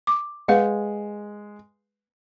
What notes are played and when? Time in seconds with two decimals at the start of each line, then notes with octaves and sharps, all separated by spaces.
0.07 D6
0.48 G#3 B4 F5 F#5